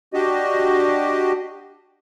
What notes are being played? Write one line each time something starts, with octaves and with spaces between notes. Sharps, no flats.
D4 F#4 G4 D#5